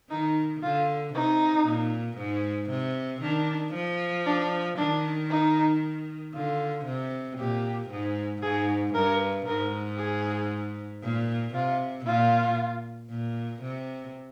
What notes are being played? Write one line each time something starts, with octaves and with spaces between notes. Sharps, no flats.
D#3 D#4
D3 F4
C3 D#4
A#2
G#2
C3
D#3 D4
F3
D4
D#3 D4
D#4
D3 F4
C3
A#2 G4
G#2
G#2 G#4
G2 A#4
G#2 A#4
G#4
A#2
C3 F4
A#2 F4
A#2
C3